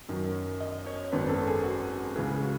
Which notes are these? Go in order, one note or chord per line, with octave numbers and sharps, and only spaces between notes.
F#2 D#3 F#3
D#5
C#5
G#1 F#2 D#3 F#3 B3 B4
A4
G#4
F#4
C#2 C#3 E3 G#4
G#4
F#4